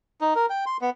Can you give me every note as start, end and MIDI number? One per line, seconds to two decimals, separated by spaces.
0.21 0.34 63
0.35 0.46 70
0.50 0.65 79
0.66 0.77 84
0.81 0.90 59